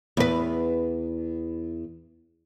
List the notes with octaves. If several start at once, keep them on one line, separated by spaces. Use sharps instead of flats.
E2 B4